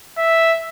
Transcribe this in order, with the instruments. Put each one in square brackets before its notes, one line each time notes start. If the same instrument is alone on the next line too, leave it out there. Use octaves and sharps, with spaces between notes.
[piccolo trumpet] E5